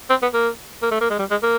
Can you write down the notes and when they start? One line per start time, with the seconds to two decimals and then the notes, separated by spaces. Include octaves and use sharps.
0.10 C4
0.22 B3
0.34 A#3
0.82 A#3
0.91 A3
1.01 A#3
1.10 G#3
1.19 G3
1.30 G#3
1.43 A#3